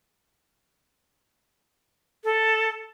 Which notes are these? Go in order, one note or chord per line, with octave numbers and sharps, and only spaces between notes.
A4